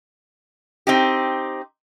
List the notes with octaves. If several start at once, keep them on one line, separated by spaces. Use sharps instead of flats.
C4 D#4 G4